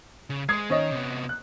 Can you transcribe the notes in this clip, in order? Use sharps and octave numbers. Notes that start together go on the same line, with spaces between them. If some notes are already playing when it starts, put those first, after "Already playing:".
C#3
G#3 G#4 D#6 G#6 C7
D#3 C#4 C#5 D#5
C3 B3
F#6